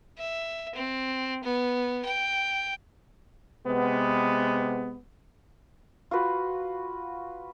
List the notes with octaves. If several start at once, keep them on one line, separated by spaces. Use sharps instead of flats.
E5
C4
B3
G5
C3 G#3 B3
F4 F#4 B4